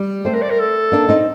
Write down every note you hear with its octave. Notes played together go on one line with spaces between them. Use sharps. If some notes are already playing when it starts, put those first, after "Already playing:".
Already playing: G3
A3 C4 C5
A#4
D5
A#4
A4
A#3 D4
C4 D#4